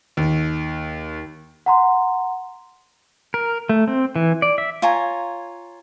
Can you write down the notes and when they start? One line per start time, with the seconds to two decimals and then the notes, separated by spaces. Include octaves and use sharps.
0.17 D#2
1.66 F#5 A#5 C6
3.34 A#4
3.69 A3
3.88 C4
4.16 E3
4.42 D5
4.58 E5
4.82 F4 C#5 G#5 A#5